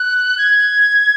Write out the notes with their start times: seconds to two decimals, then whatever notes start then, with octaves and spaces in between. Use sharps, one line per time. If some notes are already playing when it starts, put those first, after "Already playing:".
Already playing: F#6
0.38 G#6